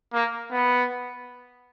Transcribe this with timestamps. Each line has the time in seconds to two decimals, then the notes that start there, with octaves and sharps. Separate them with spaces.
0.13 A#3
0.51 B3